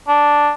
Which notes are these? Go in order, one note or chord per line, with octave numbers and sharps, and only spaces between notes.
D4